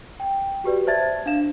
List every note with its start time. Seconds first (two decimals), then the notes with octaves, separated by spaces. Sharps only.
0.20 G5
0.64 F#4 G4 B4 D5
0.87 C5 D5 E5 A5 G#6 A6
1.26 D4 F5 E7